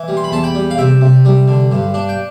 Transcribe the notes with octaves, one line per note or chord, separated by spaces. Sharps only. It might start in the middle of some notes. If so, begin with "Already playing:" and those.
Already playing: E3
G3
C6
B5
E2 A5 C6
G5 B5
G3
F5
C3 E5 G5
C3
G3
D3
G2
D4
G5